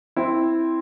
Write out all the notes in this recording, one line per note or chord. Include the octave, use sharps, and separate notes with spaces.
C4 E4